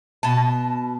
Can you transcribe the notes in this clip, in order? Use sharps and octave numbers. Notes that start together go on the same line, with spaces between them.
B2 A5